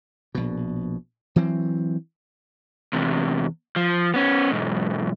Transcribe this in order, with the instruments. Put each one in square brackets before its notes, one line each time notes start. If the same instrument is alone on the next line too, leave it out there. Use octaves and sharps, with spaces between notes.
[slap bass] A#1 B2
E3 F#3 C4
[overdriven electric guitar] E2 C3
F3
B3 C#4
B1 G#2